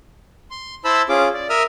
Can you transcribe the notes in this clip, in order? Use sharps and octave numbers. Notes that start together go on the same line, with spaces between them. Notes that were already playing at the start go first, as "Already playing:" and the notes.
C6
E4 C5 A5 B5 E6
C#4 F4 G#4 D6
D5
A#4 E5 D#6 F6